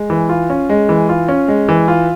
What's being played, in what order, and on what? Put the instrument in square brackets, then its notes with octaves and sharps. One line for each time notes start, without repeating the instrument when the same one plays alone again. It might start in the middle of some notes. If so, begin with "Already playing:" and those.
Already playing: [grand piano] G#3
E3
F4
C#4
G#3
E3
F4
C#4
G#3
E3
F4